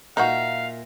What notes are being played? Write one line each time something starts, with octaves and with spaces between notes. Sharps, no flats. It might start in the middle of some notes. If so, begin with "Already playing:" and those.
A#2 D#4 F#4 A#4 E5 F5